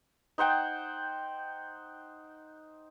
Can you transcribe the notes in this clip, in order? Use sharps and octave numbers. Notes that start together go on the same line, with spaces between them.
D#4 C5 F#5 G5